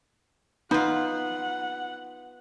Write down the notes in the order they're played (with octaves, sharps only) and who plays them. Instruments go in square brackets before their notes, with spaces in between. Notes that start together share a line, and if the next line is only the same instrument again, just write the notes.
[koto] B3 F4 [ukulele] D#4 [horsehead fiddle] F#5